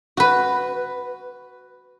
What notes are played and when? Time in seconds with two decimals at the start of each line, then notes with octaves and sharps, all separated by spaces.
0.17 F#4 B4